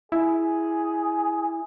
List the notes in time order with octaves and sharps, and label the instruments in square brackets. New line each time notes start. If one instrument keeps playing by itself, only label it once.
[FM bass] E4 [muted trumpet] G#4